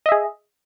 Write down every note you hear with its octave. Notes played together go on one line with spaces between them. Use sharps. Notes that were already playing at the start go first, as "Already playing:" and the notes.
G#4 D#5 E5